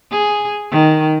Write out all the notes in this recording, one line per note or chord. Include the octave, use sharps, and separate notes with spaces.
G#4
D#3